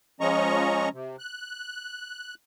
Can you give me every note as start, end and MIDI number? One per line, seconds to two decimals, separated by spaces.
0.20 0.89 53
0.20 0.89 56
0.20 0.89 61
0.20 0.89 75
0.20 0.89 82
0.20 0.89 85
0.93 1.16 48
1.19 2.34 90